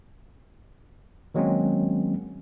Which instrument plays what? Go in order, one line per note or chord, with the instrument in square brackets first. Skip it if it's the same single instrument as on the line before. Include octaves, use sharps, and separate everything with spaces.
[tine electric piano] D#3 F#3 G#3 A#3 C4 C#4